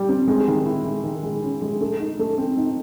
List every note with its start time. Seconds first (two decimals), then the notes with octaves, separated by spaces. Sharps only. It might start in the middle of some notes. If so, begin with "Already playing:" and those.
Already playing: G3
0.09 C4
0.27 G#3
0.47 D#3
0.66 E4
0.84 G#3
1.04 D#3
1.23 G#3
1.43 C#4
1.62 G#3
1.81 A3
2.00 D#4
2.19 A3
2.38 C4
2.57 D#4